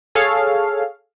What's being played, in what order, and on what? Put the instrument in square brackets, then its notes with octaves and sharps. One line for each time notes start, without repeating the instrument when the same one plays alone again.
[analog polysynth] G#4 A4 C#5 F5